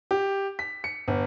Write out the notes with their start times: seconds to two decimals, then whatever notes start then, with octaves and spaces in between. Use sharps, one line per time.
0.11 G4
0.59 B6
0.84 C#7
1.08 G1